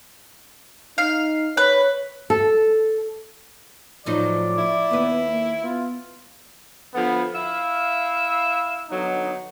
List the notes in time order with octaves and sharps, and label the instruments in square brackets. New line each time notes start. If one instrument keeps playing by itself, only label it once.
[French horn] D#4 [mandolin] F5
[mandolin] B4 [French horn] C#5
[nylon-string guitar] A4
[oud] A2 F#3 D#4 [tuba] F3 [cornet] D5
[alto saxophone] E4
[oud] D#2 B4 [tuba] B3
[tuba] A#3
[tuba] B3 [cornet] F4
[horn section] D3 F3 B3
E4 E5 F5
D3 F#3 B3 D#4